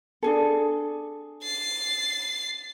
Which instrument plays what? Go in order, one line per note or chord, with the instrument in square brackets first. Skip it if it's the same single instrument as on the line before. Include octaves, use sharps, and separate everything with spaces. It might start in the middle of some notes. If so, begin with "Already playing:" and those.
[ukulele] D4 G#4 A4
[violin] A6 C7